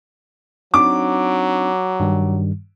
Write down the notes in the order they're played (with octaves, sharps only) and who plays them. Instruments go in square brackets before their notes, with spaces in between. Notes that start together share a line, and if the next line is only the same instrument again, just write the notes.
[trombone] F#3 [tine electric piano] C4 D4 D#4 [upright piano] D6
[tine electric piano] G2 D#3 G3